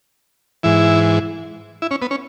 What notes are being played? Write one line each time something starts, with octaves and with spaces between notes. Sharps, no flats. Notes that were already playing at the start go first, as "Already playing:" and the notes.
G#2 E3 E4
E4
C#4
B3
C#4